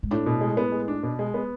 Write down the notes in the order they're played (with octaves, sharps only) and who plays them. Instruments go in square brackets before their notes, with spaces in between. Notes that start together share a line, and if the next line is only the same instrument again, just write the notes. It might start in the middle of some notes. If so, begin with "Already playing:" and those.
[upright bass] G#2
[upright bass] A2 [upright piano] D4
[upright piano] B2
G#3
B3
G#3
D4
B2
G#3
B3